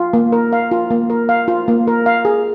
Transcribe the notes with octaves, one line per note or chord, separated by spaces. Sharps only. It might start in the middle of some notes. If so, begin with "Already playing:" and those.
Already playing: F4
A#3
A#4
F5
F4
A#3
A#4
F5
F4
A#3
A#4
F5
G#4